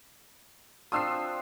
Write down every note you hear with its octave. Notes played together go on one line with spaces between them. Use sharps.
C4 D4 F4 D#6 E6 C7